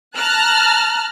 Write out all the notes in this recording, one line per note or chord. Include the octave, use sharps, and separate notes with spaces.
A5 A#5 F6 F#6